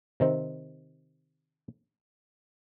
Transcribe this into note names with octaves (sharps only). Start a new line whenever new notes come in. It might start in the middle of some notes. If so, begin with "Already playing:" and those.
C3 D#3 C4